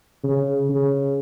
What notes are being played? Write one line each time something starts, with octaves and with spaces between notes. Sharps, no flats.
C#3
C#3